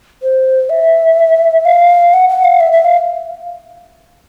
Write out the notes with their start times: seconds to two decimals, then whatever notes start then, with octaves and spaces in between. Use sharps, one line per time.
0.23 C5
0.70 E5
1.65 F5
2.14 F#5
2.29 F#5
2.44 F5
2.60 E5
2.72 E5
2.85 F5